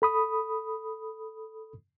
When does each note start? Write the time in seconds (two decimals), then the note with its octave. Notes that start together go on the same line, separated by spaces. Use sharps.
0.02 A4 B5 D#6